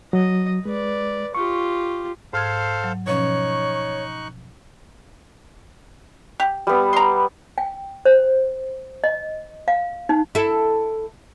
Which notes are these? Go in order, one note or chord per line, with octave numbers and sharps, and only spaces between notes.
F#3 D#5
G#3 B4 D5
F4 G4 C#6
G#2 A4 C5 F5 F6 G#6
F#3
B2 F3 C#4 D#4 C#5 C#6 F#6
G4
G3 B3
A#5 C6
G5
C5
D#5
F5
D#4
E4 A4